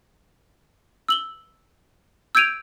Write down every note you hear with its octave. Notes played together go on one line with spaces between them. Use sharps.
E6 F#7 G7
E6 G6 G#6 D7 D#7 F7